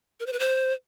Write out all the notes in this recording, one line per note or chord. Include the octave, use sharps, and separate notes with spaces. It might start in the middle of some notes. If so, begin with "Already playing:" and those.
A#4
C5
B4
C5